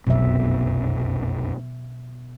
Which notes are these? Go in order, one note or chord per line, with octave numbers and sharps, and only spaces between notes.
F1 B1 F#2 B2 E5